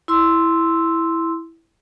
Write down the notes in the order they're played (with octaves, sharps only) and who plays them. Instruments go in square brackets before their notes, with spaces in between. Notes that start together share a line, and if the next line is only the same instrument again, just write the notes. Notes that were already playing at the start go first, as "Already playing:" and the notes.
[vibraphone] E4 C6 E6